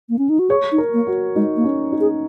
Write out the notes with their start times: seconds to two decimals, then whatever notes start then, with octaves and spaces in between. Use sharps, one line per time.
0.09 A#3
0.19 C#4
0.29 D#4
0.39 F#4
0.50 G#4 C#5
0.72 D#4
0.78 A#4
0.93 A#3
1.07 F#4
1.36 G#3 D#4
1.57 A#3
1.64 C#4
1.92 D#4
2.00 G#4